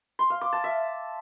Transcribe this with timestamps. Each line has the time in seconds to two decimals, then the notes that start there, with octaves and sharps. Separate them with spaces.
0.19 C6
0.30 F5
0.41 D6
0.53 A5
0.64 E5